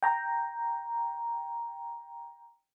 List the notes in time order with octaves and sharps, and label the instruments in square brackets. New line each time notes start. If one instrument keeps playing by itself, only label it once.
[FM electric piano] G5 A#5